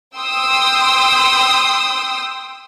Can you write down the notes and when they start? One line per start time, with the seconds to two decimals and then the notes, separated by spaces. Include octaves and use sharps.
0.17 G5 C6 D#6 E6